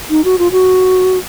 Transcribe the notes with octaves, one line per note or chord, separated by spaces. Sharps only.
D#4
F#4
F4
F#4